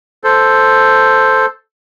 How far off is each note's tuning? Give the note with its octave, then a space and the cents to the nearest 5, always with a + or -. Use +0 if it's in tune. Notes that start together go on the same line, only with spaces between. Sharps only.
A4 +0 C5 +0